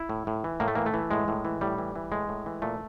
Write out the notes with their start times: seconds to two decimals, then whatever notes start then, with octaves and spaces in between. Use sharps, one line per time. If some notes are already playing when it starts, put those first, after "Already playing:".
Already playing: E4
0.09 A2
0.27 A2
0.44 E3
0.60 A2 A#3
0.68 A3
0.75 E3 A#3
0.86 A3
0.94 E3
1.11 A2 G#3
1.28 A2
1.45 E3
1.61 A2 G3
1.78 E3
1.96 E3
2.12 A2 G#3
2.29 A2
2.46 E3
2.62 A#2 A3